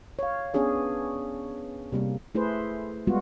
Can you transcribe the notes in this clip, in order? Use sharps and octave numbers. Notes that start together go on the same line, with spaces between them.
C#5 F5
B3 C#4 D4 G#4 C#5
C3 G3 A#3
A3 E4 G#4 B4 C5
G3 G#3 B3 F4 F#4